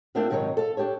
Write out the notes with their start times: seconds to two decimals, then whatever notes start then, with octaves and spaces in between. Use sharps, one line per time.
0.15 A3 A#3 C4 D4 F4 F#4
0.30 G#2 C3 D#3 F#3 D#4 C#5
0.57 A4 F5
0.77 D4 D#4 G4 A4 C#5